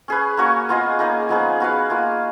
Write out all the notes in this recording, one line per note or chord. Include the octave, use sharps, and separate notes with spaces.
C#4 G#4 B4
A#3 C#4 F#4 C#5
B3 F4 G#4 D#5
A#3 D#4 G#4
F3 B3 D#4 G#4
B3 F#4 B4 F5
A#3 F4 G#4